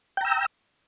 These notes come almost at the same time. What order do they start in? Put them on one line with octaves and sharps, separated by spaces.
G5 A#5 E6